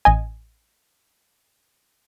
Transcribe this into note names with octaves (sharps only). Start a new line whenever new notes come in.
A1 D#5 G#5